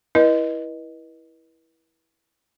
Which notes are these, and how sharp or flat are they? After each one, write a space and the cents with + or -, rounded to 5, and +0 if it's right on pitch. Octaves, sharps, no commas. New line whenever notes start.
E4 -10 B4 -40 D#5 +0